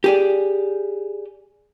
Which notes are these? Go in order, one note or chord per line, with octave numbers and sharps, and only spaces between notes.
G4 G#4 D5